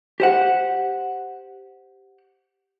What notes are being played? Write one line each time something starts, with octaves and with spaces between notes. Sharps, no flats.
G4 C5 F#5